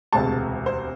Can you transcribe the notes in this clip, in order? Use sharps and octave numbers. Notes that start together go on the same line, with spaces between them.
E1 D2 C3 G#3 A5
C5